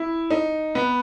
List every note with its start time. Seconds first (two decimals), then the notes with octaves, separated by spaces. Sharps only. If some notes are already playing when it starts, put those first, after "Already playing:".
Already playing: E4
0.31 D#4
0.75 B3